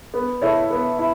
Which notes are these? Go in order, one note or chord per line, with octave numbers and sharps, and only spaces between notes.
B3
E4 A4 C#5
B3
E4